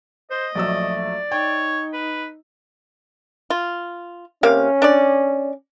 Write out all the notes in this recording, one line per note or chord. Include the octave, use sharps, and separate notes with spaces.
C5 D#5
A#1 F#3 A3 D5 E6
D#4 C#5 G5
B4
F4
C3 A#3 C#4 F5
D4 D5